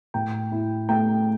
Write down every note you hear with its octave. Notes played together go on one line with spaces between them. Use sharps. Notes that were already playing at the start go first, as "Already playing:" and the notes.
A2 G5
E4
A3 G5